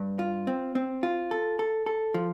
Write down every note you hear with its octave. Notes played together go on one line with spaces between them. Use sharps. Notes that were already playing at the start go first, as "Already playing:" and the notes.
Already playing: G2
F4
C4
C4
F4
A4
A4
A4
F3